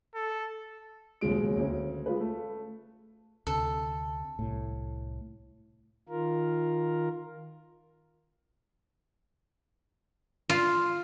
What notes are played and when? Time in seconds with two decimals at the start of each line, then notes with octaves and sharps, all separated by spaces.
0.15 A4
1.21 D#1 B1 C#3 G#3 D7
1.56 D2 C#4
2.06 G#3 F4 B4
2.20 A3
3.47 D2 C3 A4
4.39 C2 A2
6.09 D#3 F4 A#4
10.50 F4